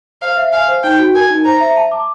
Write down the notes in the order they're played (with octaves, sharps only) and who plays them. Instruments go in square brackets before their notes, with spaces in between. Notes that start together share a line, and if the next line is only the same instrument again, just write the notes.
[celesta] C5 [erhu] F5
[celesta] E5
[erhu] F5 [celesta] G#5
[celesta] C5
[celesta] D#4 [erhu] G5
[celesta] F#4
[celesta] A#4 [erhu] G#5
[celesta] D#4
[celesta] C5 [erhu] A#5
[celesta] E5
A5
D6